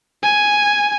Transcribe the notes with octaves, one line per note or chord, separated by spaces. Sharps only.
G#5